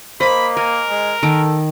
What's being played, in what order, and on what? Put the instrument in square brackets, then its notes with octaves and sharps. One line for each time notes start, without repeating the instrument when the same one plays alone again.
[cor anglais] A#3 [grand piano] C5 [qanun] D#5 [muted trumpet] B5
[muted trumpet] A#4 [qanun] G#5
[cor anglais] G#3
[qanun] D#3 [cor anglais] A4 [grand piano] D7